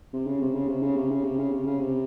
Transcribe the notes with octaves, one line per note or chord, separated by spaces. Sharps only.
C3
C#3
C3
C#3
C3
C#3
C3
C#3
C3
C#3
C3
C#3
C3